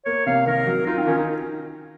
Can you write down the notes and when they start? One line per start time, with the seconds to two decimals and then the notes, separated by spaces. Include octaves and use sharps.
0.05 A#3 C#5
0.26 C3 F5
0.46 D#3 A#4
0.67 F#3
0.87 D#4 F4
0.98 C4
1.03 D#4
1.07 D#3 C#4
1.18 D#4